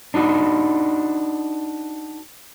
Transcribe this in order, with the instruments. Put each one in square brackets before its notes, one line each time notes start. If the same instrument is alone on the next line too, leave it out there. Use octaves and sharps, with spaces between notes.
[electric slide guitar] D4 D#4 F#4